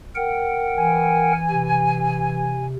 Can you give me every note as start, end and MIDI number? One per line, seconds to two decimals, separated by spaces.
0.15 1.33 70
0.15 1.33 78
0.15 1.33 79
0.77 2.66 52
0.77 2.66 80
1.50 2.76 48